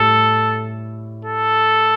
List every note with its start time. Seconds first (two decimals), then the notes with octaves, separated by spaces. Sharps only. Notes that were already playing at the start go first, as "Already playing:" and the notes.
Already playing: A2 G3 A4
1.25 A4